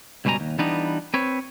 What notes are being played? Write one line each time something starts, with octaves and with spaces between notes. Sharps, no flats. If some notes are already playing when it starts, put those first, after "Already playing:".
C#2 G2 B2 G3 G#5 A#5
D#2
E3 G3 B3 D4 D#4
C4 B4 C#5